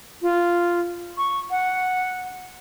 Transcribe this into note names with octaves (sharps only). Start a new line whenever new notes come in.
F4
C#6
F#5